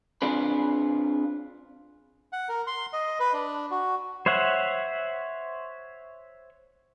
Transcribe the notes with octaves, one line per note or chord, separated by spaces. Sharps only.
C4 D4 F4 G#4 B4
F#5
A#4
C6
D#5
B4
D4
F#4
C5 C#5 E5 F#5